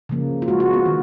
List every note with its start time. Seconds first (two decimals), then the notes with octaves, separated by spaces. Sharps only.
0.09 C#3 F3 A#3
0.42 F4
0.48 C#3 G#3 F#4
0.60 F#4
0.74 B3
0.86 D#3 A#3